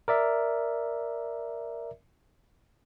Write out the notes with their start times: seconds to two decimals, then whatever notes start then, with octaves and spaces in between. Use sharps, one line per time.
0.08 A#4 D5 E5